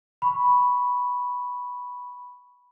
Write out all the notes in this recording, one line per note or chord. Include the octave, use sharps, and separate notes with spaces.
B5 C#6